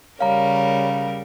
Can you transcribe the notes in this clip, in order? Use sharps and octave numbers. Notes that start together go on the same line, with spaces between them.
C#3 G3 A#4 C#5 F5 A#5